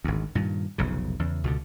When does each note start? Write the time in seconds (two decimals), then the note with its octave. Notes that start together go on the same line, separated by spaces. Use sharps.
0.04 G#1 D2
0.35 G2 A#2 D#3
0.78 F1 B1 C#3
1.19 E2 C#3
1.44 C#2 B2 D3